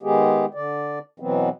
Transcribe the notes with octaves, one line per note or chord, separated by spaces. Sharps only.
D#3 G#3 B3 G4 G#4
D3 D5
B2 E3 F#3 B3 C4